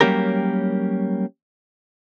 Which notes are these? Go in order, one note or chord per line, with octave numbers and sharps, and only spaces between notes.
F#3 G3 A#3 C#4 G4 A#4